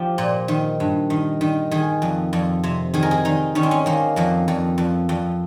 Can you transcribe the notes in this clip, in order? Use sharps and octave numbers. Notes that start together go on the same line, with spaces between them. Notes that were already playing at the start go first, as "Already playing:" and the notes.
Already playing: F3 G4
A#2
D#3
G2
D#3
D#3
D#3 G#4
F2
F2
C3
D#3 G#4
A#4
G#4
D#3 D#4
D#3 C#4
C4
C#4
D#3 A#3
F2 A#3
F2
F2
F2